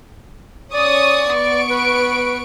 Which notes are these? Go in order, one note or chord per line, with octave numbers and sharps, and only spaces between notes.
C#4 D5 C#6 D#6
B3 C#6 D7
B4